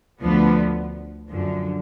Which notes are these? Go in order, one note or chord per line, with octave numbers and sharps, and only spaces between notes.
D2 D3 F3 B3
F#2 D3 F3